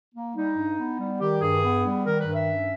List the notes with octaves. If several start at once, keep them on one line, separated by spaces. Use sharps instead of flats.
A#3
G3 D#4
G2
B3
G3
D#3 G4
G2 G#4
B3
G3
D#3 A#4
B4
G2
E5
C#4